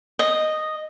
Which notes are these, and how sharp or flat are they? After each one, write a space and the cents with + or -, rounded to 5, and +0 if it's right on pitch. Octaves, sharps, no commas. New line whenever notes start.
D#5 -5